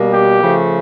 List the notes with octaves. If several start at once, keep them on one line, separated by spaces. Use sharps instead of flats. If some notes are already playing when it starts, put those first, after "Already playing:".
Already playing: B2 G3 A#3
G4
C#3 F3 A3